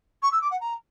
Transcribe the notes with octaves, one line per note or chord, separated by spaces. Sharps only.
C#6
E6
D6
F#5
A#5